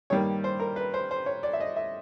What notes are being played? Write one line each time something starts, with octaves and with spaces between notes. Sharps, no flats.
G2 D#3 G3 A#3 C#5
C5
A#4
B4
C5
C5
C#5
D5
E5
D#5
E5